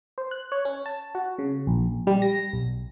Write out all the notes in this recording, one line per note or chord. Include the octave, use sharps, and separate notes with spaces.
C5
F#6
C#5
C#4
A5
F#4
C#3
A#1
G3
A#6
B1